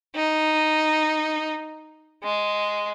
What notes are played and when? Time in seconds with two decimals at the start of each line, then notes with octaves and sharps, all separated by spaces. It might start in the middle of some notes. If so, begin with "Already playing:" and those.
0.15 D#4
2.24 G#3